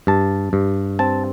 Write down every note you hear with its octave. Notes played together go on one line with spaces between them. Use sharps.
G2 A5
G2
C4 A5